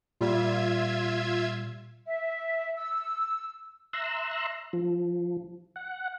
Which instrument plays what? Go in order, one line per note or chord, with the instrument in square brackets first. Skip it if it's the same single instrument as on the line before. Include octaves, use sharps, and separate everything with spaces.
[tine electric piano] A#2 G3 [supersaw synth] F4 E5 G#6
[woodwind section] E5
E6
[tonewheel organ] E5 A#5 C6 E6 F#6
F3
F#5